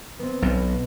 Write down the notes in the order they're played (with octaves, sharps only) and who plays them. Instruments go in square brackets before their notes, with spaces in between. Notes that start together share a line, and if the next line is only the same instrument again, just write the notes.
[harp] B3 C4
[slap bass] B1 [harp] B2